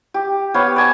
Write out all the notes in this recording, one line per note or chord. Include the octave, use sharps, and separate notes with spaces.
G4
B3 G4 C#5 F5
D5 G#5 A5